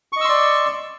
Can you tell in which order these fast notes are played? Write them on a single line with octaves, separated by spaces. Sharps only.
C#6 D#5 E6 C6 D5